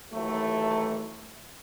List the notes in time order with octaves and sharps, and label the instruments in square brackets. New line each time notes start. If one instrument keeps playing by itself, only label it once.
[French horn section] D#2 E3 F#3 A3